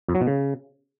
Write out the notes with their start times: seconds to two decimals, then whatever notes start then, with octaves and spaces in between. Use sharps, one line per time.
0.08 F2
0.15 F#3
0.21 B2
0.27 C#3